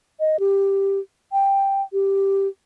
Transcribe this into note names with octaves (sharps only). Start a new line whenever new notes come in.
D#5
G4
G5
G4